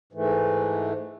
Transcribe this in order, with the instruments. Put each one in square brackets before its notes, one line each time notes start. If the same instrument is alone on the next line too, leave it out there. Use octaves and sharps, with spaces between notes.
[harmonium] G#2 E3 A3